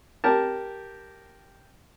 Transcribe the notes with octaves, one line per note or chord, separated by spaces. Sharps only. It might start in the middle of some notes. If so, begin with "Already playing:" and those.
G4 A#4 A5